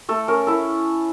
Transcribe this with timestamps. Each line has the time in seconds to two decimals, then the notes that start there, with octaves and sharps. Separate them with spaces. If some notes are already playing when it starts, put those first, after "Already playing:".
0.09 A3 A4
0.28 C#4 A#4
0.47 E4 A4